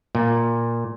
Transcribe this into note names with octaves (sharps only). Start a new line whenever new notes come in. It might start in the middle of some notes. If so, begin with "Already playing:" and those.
A#2